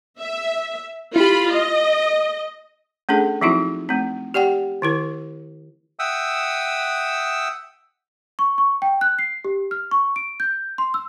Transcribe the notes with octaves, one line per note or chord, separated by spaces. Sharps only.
E5
E4 F4 G4 B5
D#5
A3 C#4 D4 G#4 A4
F3 F#3 C4 D#4 E4 F#4
A3 C4
G4 D5 F#5 G5
D#3 E4 A#4
E5 F#5 G5 D#6 E6
C#6
C#6
G5
F#6
C7
G4
F6
C#6
D7
G6
C6
E6